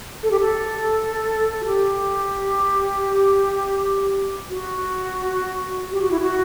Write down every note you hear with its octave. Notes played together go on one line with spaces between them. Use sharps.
A4
G4
A4
F#4
G4
F#4
G4
F#4
E4
F#4